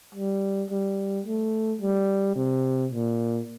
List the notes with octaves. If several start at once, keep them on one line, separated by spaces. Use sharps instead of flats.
G3
G3
A3
G3
C3
A#2